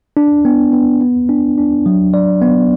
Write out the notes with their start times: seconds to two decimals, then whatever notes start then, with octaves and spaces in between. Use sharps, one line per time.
0.17 D4
0.45 B3
0.73 B3
1.01 B3
1.29 D4
1.58 D4
1.86 F#3
2.14 D5
2.42 B3